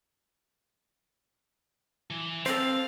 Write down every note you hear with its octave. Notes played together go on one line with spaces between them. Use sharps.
E3
C4 A4 C5 F5